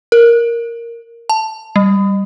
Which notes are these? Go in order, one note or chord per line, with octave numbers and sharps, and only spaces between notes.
A#4
A5
G3